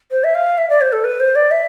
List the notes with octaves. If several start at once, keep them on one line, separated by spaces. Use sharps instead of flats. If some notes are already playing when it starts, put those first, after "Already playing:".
C5
E5
F5
E5
D5
C5
A4
B4
C5
D5
E5